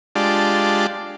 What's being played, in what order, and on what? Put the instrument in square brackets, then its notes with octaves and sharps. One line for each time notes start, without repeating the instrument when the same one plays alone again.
[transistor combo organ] G#3 D4 F4 G4 D5 A5